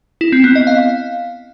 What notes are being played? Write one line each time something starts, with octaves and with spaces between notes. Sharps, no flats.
E4
C4
B3
D#5
F5